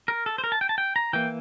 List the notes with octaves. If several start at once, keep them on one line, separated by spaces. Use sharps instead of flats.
A#4
A4
C5
A#4
A5
G5
A5
G5
A#5
E3 A#3 G5